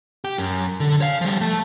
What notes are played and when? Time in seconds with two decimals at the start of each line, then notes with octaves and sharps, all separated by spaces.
0.25 G4
0.38 F#2
0.80 D3
1.01 C#5 F5
1.21 F3 G3
1.41 A3 A5